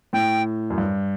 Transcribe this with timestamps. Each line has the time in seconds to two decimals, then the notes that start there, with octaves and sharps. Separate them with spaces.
0.13 A2 G5
0.70 F#2
0.78 G2